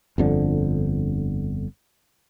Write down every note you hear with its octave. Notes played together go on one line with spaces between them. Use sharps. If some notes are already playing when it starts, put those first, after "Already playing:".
G1 F2 D3